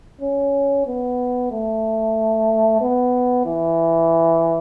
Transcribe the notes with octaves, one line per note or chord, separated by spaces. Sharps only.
C#4
B3
A3
B3
E3